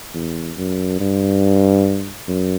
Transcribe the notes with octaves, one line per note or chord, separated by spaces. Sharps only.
E2
F#2
G2
F#2